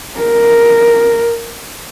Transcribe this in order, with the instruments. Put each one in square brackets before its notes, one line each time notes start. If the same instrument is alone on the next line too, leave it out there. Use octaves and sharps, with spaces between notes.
[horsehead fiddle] A#4